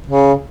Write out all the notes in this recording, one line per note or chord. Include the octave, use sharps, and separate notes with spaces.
C#3